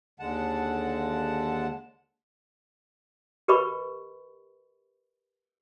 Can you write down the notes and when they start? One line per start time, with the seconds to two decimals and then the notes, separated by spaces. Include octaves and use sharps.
0.20 D#2 D3 G#3 F#5 A5
3.48 G4 A#4 B4 D#5 B5 C#6